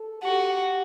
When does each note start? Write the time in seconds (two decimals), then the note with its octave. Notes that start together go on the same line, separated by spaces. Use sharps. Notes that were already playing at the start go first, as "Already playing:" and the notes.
Already playing: A4
0.23 F#4 G4